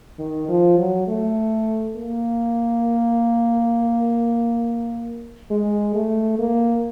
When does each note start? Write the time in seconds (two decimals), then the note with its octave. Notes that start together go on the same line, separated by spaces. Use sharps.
0.19 D#3
0.49 F3
0.78 F#3
1.07 A3
1.96 A#3
5.51 G#3
5.95 A3
6.39 A#3